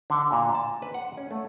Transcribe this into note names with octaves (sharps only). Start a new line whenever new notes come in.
D3
A#2
A5
B4
F#5
C#4
A3